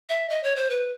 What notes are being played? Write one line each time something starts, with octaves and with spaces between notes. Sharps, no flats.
E5
D#5
C#5
C5
B4